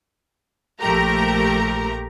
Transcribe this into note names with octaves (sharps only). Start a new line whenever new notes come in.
A#1 F3 A3 G4 A#4 A#5